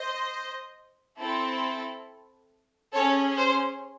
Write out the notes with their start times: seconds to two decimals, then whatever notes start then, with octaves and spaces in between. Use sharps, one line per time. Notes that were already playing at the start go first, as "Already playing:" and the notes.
Already playing: C5 D#5
1.18 C4 E4 A4
2.93 C#4 G#4 A4 C#5
3.37 C5